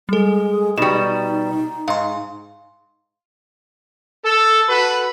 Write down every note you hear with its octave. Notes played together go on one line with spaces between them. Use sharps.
G3 G#3 A4
B2 G3 D#4 E7
G#2 F5 C6
A4
F#4 A4 B4